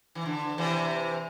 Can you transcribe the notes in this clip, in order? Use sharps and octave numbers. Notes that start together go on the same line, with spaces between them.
E3
D3
C3 E3